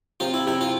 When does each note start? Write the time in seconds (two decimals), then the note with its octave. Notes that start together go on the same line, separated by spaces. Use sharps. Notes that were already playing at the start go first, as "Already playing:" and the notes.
0.20 C3 F4
0.34 E4
0.47 C3 E4
0.61 F4